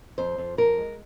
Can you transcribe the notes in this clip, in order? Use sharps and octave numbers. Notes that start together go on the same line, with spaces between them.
F2 C5
F2
F2 A#4
G#3